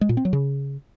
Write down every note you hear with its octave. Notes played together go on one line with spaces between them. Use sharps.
G#3
A#2
C4
F#3
C#3